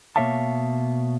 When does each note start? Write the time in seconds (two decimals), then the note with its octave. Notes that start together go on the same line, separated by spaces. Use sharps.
0.16 B2 A#3 C#5 E5 F5 A5